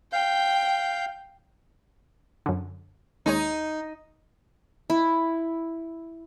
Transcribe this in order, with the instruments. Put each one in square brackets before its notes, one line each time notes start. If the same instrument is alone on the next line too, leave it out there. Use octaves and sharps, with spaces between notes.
[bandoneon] F5 G6 [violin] G5
[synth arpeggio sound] F#2 D3
[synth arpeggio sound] D#2 G#3 C#5 [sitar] D#4
[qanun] E4